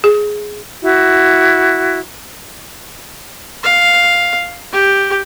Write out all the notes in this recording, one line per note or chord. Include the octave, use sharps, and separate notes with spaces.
G#4
E4 F#4
F5
G4